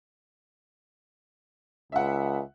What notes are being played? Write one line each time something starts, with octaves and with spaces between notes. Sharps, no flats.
C#2 E5 F#5